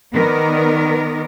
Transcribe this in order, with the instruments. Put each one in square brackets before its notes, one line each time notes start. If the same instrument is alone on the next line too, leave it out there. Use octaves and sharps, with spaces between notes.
[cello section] D#3 B3 A#4 D5